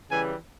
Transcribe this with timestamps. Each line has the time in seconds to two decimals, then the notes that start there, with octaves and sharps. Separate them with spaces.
0.10 C#3 E3 G3 G#5